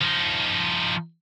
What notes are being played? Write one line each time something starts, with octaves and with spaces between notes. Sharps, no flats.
F3 D#4